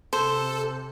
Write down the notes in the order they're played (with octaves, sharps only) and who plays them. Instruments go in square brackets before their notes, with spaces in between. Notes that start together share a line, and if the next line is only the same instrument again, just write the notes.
[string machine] C3 [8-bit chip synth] A4 [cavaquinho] C5